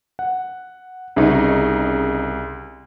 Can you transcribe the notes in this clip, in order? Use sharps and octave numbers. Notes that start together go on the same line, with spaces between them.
F#5
C2 C#3 D#4